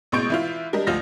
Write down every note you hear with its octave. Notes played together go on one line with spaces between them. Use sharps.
A1 B2 G#3 C#6 G6 D7
E3 E4 F4
G3 D4 A#4 D#5
D2 F3 F4 F6 A#6